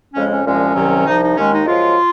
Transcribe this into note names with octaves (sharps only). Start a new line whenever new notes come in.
F2 C#3 G#3 C#4
C#4
C2 A#2 F3 G#3 C#4
C2 C3 D#3 F#3
C2 C3 F3 D#4
D#4
D#2 D#3 G#3 C#4
D#4
F#2 F3 G#3 F4